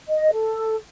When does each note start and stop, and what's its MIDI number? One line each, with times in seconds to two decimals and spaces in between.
0.09 0.31 75
0.33 0.75 69